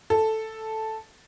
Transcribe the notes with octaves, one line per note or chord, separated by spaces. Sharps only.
A4